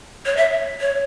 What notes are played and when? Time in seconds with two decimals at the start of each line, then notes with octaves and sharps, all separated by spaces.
0.26 C#5
0.37 E5
0.81 C#5